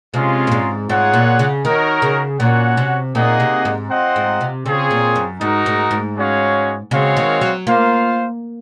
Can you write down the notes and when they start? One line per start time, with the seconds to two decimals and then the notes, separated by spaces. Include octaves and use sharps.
0.14 C3 G#3 C#4 F4
0.47 A#2
0.52 G#2
0.89 G#2 F4 G#4 C#5 F#5
1.14 A#2
1.39 C#3
1.64 D#3 D#4 F#4 A#4 C#5
2.02 C#3
2.40 A#2 C#4 F#4 C#5 F#5
2.77 C3
3.15 A#2 A#3 D#4 G#4 D#5 F#5
3.40 C3
3.65 G#2
3.90 C4 F4 C5 D#5 F#5
4.16 G#2
4.41 C3
4.66 C#3 C4 F4 G#4 C#5
4.91 A#2
5.16 F#2
5.41 G#2 D#4 F#4 A#4
5.66 G#2
5.91 G#2
6.16 G#3 C#4 F#4 C#5 F5
6.91 C#3 G#3 C4 F#4 C#5 F5
7.17 D#3
7.41 F#3
7.67 A#3 F4 C5 F5